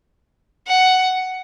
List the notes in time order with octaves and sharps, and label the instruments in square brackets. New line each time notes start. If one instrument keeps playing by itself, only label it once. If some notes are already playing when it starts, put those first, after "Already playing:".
[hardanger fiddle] F#5